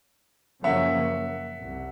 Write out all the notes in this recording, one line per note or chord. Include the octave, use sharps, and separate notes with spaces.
F#2 C#3 F3 A#3 C#4 E5 F#5
C2